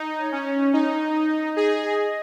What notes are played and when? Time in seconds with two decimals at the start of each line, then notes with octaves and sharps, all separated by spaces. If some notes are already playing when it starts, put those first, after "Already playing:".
Already playing: D#4
0.17 C#5
0.32 C#4
0.45 C#5
0.73 D#4 D#5
1.56 G#4